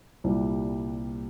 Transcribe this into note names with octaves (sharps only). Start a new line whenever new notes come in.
C2 A#2 G3